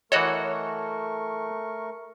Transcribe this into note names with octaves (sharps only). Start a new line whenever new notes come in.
E3 A3 F#4 A4 A#4 C#5 D#5 C#6